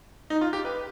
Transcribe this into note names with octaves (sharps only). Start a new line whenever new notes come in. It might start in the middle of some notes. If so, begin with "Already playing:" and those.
D#4
F4
G4
B4